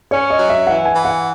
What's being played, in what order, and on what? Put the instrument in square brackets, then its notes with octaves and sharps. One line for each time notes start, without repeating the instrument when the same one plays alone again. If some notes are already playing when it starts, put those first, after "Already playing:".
[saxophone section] C#4 [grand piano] C#5
[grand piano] D#5
[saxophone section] F#3
[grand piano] E5
[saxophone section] E3 [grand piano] F#5
[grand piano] G#5
[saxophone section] E3
[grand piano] F#5